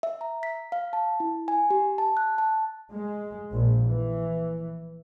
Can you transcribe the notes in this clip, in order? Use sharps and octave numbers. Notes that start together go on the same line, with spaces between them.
E5
A#5
B6
F5
A5
E4
G#5
G4
A5
F#6
A5
G#3
A#1
E3